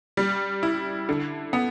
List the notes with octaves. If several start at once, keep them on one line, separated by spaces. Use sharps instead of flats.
G3
E4
D3
B3